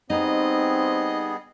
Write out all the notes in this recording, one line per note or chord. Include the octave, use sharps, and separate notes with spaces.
G3 B3 C4 D#4 G#4 D#5